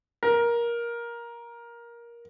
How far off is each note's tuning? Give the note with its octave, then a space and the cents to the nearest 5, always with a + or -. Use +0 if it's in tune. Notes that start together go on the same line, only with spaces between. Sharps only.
A#4 +15